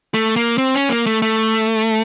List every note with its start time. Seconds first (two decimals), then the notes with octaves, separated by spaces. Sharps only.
0.14 A3
0.36 A#3
0.58 C4
0.74 C#4
0.89 A#3
1.06 A3
1.22 A3